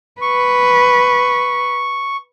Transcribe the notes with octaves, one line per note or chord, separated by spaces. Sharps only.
B4 C#6